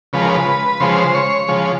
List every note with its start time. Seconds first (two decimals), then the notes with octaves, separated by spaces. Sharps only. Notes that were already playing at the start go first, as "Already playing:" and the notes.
0.13 C#3 F3 G#3 B4
0.21 A#4
0.31 B4
0.80 C#3 F3 G#3 C5
1.15 C#5
1.48 C#3 F3 G#3